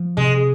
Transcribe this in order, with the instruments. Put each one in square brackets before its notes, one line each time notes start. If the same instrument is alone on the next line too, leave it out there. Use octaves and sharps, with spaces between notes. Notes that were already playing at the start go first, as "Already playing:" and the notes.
Already playing: [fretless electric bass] F3
[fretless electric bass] C3 [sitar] G#3